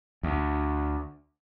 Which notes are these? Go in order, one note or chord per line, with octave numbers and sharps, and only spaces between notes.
D2